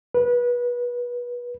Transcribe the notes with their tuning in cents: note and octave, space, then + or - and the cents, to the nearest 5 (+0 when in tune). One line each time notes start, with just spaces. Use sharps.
B4 -25